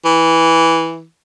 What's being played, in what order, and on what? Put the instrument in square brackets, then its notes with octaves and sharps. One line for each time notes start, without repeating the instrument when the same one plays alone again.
[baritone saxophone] E3